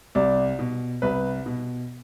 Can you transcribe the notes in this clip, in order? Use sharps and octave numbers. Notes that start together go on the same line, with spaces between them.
C2 D5
B2
C2 B4
B2